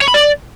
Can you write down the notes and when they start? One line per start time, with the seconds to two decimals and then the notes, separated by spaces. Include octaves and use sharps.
0.01 C#5
0.08 B5
0.14 D5